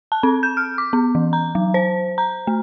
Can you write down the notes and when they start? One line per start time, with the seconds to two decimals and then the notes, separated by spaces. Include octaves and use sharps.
0.12 A5
0.23 C4
0.43 G6
0.57 F6
0.78 D6
0.93 B3
1.15 E3
1.33 A#5
1.55 F#3
1.74 C5
2.18 A#5
2.47 A3